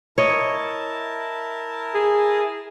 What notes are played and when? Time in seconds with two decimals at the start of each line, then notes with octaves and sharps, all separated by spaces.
0.18 E4 A#4 C#5 D#5 A5
1.95 G#4